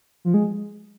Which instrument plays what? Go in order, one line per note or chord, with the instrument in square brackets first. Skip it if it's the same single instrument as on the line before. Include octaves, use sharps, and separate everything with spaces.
[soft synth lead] F3
G#3